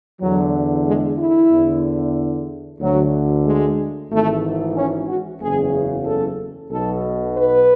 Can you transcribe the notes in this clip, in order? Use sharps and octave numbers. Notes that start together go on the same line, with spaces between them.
E2 D3 F#3
G#3
E4
E2 D3
D2 D3 F#3
G#3
G#1 G#2 E3 A3
C#4
F#4
F#1 E2 C#3 G#4
A4
B1 B2 A4
B4